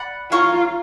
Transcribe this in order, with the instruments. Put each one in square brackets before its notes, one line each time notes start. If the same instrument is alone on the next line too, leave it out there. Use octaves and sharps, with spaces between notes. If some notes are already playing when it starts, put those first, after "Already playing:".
Already playing: [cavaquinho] D5 F#5 B5
[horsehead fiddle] F4 [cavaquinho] C#5 F5 A#5 C#6